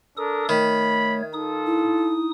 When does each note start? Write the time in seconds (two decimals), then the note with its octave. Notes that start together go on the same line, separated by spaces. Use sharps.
0.17 D4 A4 A#4 D#6
0.49 D#3 A3 C#5 B5
1.33 D#4 F4 A4 D#6
1.67 E4